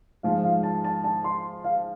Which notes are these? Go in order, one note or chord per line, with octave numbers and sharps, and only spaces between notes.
G#2 F3 G#3 F5
F5
A5
A5
A5
C6
F5